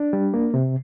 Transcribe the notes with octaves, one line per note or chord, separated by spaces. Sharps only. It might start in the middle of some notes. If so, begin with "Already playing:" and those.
Already playing: D4
G3
A#3
C3